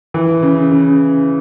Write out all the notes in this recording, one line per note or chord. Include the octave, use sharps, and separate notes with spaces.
E3
C#3
C#3